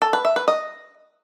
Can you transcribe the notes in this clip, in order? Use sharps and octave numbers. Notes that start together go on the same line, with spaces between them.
A4
B4
E5
B4
D#5